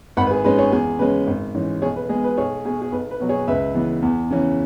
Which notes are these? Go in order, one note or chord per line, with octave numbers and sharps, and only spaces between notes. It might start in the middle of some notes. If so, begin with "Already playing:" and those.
G#1 F#5 B5
B4
G#4
G#2 G#3 C#4 B4
G#4 C#5
E2 G#4
C#3 G#3 C#4 B4
G#1
G#2 E3 C#4
B1 G#4 C#5
B4
B2 G#3 B3 G#4
B4
B1 G#4 C#5
B2 B3 G#4
G#4
B1 B4
B4
B2 F#3
G#4 C#5
C#2 B4 E5
C#3 E3 B3
E2
C#3 E3 C#4